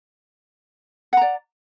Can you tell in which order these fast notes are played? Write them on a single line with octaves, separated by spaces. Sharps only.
F#5 A#5 D5